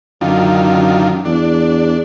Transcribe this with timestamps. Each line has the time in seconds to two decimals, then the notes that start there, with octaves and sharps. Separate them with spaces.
0.21 F#2 D3 D#3 F4
1.25 E2 D4